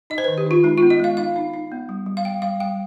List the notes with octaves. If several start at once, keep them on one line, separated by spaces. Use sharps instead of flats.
D#4 D#5
C5
D#3 B4
G4
D#4 F4
G#3 D#4
B3 F4
D#5
G#3 F5
D#4 F5
D#4
D#4
B3
G3
G3
F5
G3 G5
G3 F5
G3 G5